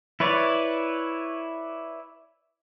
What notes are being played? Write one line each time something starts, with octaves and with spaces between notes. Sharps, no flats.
E4 B4 C#5 D5